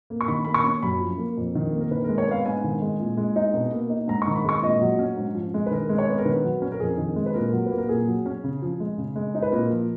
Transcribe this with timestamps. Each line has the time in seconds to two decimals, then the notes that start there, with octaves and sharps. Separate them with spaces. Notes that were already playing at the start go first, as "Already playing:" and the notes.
0.10 A#3
0.21 C#6
0.28 D#3 B5
0.45 A#3 B5
0.54 C#6
0.64 C#4
0.82 F#2 B5
1.01 F3
1.18 A#3
1.37 F2
1.55 D#3
1.72 A#3
1.81 A#4
1.91 D#3 B4
2.04 A#4
2.09 G#3
2.18 C#5
2.27 B3 F5
2.45 G#2 G#5
2.64 D#3
2.82 G#3
3.00 A#2
3.17 G#3
3.36 D#4
3.54 B2
3.72 A#3
3.90 D#4
4.08 G#2 A#5
4.22 C#6
4.27 D#3
4.36 B5
4.44 G#3 C#6
4.62 A#2 D#5
4.82 F#3
4.99 C#4
5.17 G#2
5.35 F3
5.54 G#3
5.66 B4
5.71 D#3 A#4
5.89 G#3
5.98 C#5
6.08 B3
6.18 A#4
6.25 D#3 B4
6.45 F#3
6.62 C#4
6.72 A#4
6.80 F2 G#4
6.98 D#3
7.16 G#3
7.26 B4
7.34 A#2 A#4
7.53 F#3
7.66 B4
7.71 A#3
7.78 A#4
7.89 A#2 G#4
8.07 F#3
8.26 C#4
8.44 C#3
8.62 F3
8.80 G#3
8.98 C#3
9.16 G#3
9.35 D#4
9.42 B4
9.52 A#2 A#4
9.70 F3